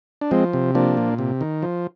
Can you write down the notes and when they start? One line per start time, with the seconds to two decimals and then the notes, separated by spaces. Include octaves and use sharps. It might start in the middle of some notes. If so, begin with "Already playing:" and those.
0.21 D4
0.31 F3 G#3 C4
0.53 C3
0.75 F3 A#3 D4
0.97 A#2
1.19 C3
1.41 D#3
1.62 F3